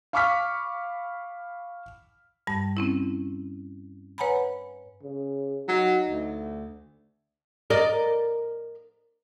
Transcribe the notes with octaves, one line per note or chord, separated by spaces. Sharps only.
F5 B5 C#6 D6 F6 B6
G2 G3 A5
C4 C#4 E4
B4 C#5 F#5 G#5 A#5 B5
C#3
F#3 D#4
D2
A#4 D5 D#5